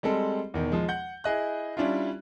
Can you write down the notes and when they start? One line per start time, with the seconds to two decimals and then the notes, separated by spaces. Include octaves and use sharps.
0.03 G3 G#3 C4 A4
0.54 E2 B2 D#3
0.72 F3 G#3
0.88 F#5 G6
1.24 E4 G#4 D#5 F#6
1.77 G3 C#4 D4 E4 F4